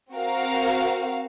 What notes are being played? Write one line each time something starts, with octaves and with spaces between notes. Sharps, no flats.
C4 F#4 A#4 F5